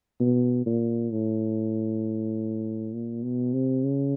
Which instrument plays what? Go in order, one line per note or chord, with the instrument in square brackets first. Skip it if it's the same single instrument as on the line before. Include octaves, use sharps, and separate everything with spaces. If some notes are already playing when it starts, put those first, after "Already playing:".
[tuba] B2
A#2
A2
A#2
B2
C3
C#3